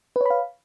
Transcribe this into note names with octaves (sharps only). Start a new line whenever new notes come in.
B4 C#5 F5 B5